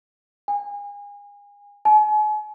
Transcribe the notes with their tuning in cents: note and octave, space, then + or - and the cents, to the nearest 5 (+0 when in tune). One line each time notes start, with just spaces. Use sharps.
G#5 -35
G#5 +40